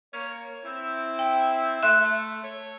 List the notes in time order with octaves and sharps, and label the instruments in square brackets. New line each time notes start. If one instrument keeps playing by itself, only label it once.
[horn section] A#3 C#5
C4 E4
[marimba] G5
[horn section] A3 [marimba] E5 C6 F#6
[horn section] A3 C#5